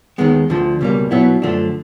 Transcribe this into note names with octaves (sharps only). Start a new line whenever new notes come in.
D#2 D#3 G#3 B3
D2 D3 F3
C#2 B2 G3 A#3
B2 F#3 B3 E4
F#2 D3 F3 A3 D4